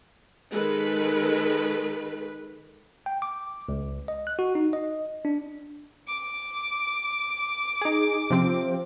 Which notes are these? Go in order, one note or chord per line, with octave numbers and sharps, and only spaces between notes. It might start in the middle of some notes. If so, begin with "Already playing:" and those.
D#3 G#3 A4 B4
G5
D6
C#2
D#5
F#6
F#4
D#4
D#5
D4
D6
D#4 G#4
C3 F3 C4